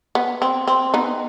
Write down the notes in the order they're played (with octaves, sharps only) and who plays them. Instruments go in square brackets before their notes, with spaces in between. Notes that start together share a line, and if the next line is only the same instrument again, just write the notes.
[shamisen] B3
C4
C4
B3 D#4